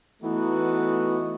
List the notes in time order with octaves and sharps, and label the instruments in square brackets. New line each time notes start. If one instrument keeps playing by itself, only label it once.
[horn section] E3 A3 B3 D#4 F#4